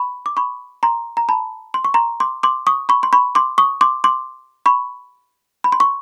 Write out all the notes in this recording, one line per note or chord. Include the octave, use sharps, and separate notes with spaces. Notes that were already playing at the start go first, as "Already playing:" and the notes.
Already playing: B5 C#6
D6
B5 C#6
A#5 C6
A#5
A5 B5
C6
C#6
A#5 C6
C6 D6
C6 D6
C#6 D#6
B5 C#6
C6
B5 C#6
C6 D6
C#6 D#6
C6 D6
C6 D6
B5 C#6
B5
C6
C#6